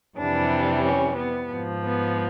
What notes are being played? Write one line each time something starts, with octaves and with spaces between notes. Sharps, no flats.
F2 C3 E3 G3 D4
C#4
B3
G#2 F3
B3